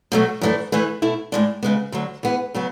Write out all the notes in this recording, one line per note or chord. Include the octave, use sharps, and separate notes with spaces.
B2 F#3 A3
F#2 E3 A3 D4
E3 A3 E4 G#4 B4
B2 A3 E4
A2 G#3 D4
C#3 G#3 B3
D2 D3 F#3
E3 B3 E4 G#4
C#3 F#3 B3